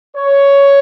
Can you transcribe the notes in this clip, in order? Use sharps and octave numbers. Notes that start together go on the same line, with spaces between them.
C#5